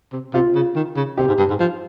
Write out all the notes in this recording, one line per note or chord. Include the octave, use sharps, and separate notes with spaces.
C3
C3 F4
C#3
D#3
C#3
C3 G4
G#2
G2
G#2
F3